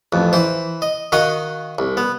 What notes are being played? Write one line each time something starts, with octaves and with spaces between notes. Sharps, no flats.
A1 F2
E3 C5
D#5
D#3 F#4 D#5 F5 D#6
C2
B3